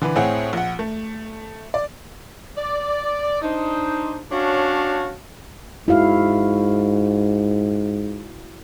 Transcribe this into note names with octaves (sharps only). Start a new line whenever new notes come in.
D3 E3 B4
A2 C4 E4 G#4 C#5 F#5
A#1 F#5
A3
D5
D5
D4 D#4 C5
C#4 D4 F#4 C#5 F5 A5
G#2 E4 F#4 F5